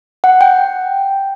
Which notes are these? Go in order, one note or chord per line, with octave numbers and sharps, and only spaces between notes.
F#5
G5